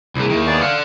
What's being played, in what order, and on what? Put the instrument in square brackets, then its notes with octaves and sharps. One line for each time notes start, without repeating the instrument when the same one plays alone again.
[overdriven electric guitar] C2 E3 [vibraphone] E4 G#4
[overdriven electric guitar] D#2 D#3 [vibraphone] E5 C#6
[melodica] B3 G#4 D5
[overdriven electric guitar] A4 F#5 [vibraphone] D5 [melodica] F5